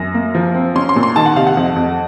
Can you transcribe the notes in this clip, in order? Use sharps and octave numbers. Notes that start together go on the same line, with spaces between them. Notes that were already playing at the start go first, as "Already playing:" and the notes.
Already playing: F#2 A#6
A#3
F3
C4
C#4 C6
C6
A#2
C6
D#3 A5
F#5
C3 F5
F#5
F2
F2